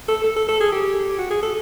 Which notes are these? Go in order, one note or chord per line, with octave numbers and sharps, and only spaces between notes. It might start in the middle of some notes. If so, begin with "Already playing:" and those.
A4
A4
A4
A4
G#4
G4
F#4
G#4
A4